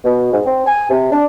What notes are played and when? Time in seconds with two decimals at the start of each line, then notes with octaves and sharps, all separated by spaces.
0.04 B2
0.32 G#2
0.45 C4
0.66 G#5
0.90 C3
1.12 D4